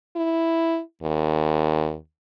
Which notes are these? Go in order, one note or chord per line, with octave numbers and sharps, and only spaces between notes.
E4
D#2